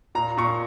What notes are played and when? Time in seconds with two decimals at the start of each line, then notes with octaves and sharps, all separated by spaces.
0.15 A#2 A#5
0.37 A#2 C#6